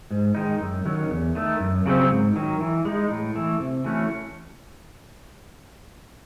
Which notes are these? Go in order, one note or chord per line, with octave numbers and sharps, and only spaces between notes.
G#2
D#3 G#3 D#4
F#2
D#3 F#3 C#4
E2
D#3 A3
F#2
C#3 F#3 C4
G#2
D#3 F#3
E3
G#3 D#4
A2
E3 A3
C3
E3 A3 C#4 F#4